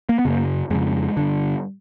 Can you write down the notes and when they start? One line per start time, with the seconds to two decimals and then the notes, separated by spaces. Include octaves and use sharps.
0.09 A#3
0.19 B3
0.25 F#2 C#3 A#3
0.70 F2 C#3 G#3
1.17 G2 D3